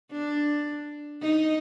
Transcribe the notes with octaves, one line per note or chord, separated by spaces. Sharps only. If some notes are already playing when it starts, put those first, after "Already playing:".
D4
D#4